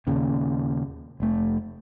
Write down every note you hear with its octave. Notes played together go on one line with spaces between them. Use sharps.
D#2 A#2 C#3
F1 A3